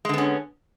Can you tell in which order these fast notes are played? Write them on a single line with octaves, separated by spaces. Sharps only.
G#3 D3 B3 C#4